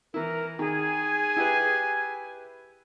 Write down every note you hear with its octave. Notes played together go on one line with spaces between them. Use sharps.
E3 E4 A#4
D#3 G#4 G#5
E4 G4 B4